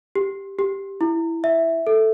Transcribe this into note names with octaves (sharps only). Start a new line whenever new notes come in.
G4
G4
E4
E5
A4